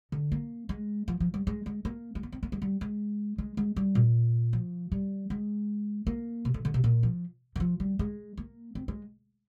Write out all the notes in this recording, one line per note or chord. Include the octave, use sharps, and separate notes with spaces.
D3
A#3
G#3
F3
F3
G3
G#3
G#3
A#3
G#3
A#3
C4
A#3
G#3
G3
G#3
G#3
G#3
G3
A#2
F3
G3
G#3
A#3
C3
D3
D3
C3
A#2
F3
D#3
F3
G3
G#3
A#3
C4
G#3